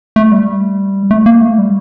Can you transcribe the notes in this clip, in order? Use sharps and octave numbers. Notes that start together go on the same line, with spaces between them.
A3
G3
A3
A#3
A3
G3